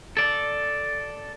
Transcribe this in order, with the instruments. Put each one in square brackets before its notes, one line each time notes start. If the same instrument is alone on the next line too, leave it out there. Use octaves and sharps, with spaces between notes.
[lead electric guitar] A4 D5